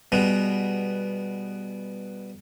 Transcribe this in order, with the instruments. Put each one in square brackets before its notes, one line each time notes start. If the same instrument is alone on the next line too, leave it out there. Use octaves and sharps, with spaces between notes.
[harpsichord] B2 G3 G#3 B3